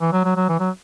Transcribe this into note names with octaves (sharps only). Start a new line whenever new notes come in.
E3
F#3
F#3
F#3
E3
F#3